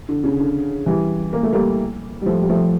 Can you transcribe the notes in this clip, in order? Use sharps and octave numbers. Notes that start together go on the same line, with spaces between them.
D3
C#3
D3
E3 G3
A#3
A3
G3 A#3
G3
F3 A3
G3
F3 A3